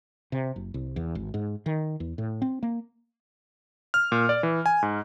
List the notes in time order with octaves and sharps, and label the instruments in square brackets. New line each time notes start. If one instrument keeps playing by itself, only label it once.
[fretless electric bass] C3
F#1
C2
E2
G#1
G#2
D#3
E2
A2
C4
A#3
[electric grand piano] F6
A#2
D5
E3
G#5
G#2